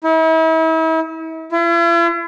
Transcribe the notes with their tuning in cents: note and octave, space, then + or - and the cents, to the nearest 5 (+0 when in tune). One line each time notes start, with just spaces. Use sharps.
E4 -40
E4 +45